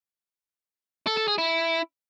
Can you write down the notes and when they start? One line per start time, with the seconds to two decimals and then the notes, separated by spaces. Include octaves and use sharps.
1.07 A4
1.17 A4
1.28 G#4
1.38 E4